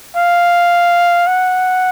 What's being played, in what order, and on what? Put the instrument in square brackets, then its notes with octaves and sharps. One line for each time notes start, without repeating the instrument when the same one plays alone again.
[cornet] F5
F#5